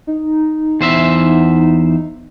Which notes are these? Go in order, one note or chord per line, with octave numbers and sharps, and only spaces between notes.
D#4
E2 C5 E5